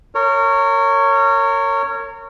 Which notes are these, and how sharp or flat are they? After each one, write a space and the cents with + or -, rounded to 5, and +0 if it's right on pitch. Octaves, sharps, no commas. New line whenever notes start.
A#4 -30 C#5 +0